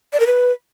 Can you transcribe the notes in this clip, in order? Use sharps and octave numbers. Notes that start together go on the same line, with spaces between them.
D5
A#4
B4